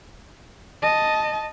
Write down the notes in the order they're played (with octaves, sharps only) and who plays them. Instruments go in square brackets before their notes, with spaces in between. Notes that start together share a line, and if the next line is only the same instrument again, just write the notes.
[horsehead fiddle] D#5 A5